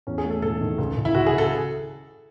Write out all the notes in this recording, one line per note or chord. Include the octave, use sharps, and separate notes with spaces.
E2 C#4
G#4
A3
A4
E1 A4
D#3
C#2
C#2
E4
C#2 F#4
G#4
C#2
A4